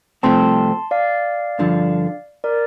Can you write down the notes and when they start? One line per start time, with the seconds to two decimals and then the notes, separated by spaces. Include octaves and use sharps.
0.23 C2 C3 F3 A3 C4 A5 C6
0.91 D5 F5
1.59 G2 D3 F3
2.44 A#4 D5